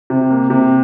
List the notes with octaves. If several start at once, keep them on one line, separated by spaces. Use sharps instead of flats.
C3
A#3
C3